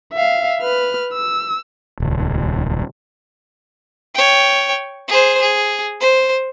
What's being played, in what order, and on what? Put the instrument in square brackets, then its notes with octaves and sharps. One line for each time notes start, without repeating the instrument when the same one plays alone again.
[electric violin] E5 F5
B4 F6
E6
[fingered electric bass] D#1 C#2
[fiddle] C#5 G5
G#4 C5
G#4
C5